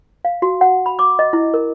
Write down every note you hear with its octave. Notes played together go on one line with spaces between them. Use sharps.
F5
F#4
F#5
B5
D6
D#5
E4
A#4